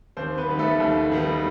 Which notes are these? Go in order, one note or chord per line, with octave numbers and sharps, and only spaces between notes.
D#2 C4 C5
B3 B4
D#3 G3 B3
A3 A4
D#2
D#3 G3 B3